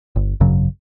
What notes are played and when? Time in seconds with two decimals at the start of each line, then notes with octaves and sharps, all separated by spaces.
0.16 G1
0.40 G#1 F#2 C#3 F#3